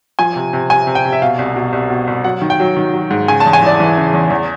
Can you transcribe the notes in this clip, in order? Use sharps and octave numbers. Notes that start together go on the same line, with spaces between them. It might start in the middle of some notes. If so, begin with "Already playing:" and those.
F3 G#5
C3
C3
C3 G#5
C3
G5
C3
E5
B2 F5
C2
B2
C2
B2
C2
F#3 F#5
D#3
G5
F#3
D#3
F#3
G#2
C#3 G#5
A5
E2
G#5
E3 D5
E3
C#3
E2
E2